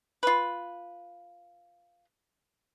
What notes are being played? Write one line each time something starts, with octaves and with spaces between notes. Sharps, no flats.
F4 B4